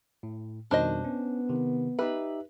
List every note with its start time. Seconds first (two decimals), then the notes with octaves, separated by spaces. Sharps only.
0.23 A2
0.71 F2 B2 D#3 G3 D4 C5 D#5
1.04 B3 C#4
1.49 C3 D#3
1.99 D#4 G4 B4 E5